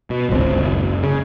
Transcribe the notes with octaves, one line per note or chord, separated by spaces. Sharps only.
B2
D1 G#1 C#2 C4
F#1
C#3